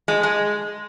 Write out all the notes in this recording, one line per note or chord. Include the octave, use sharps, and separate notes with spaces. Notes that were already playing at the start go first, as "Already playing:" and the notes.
G#3
G#3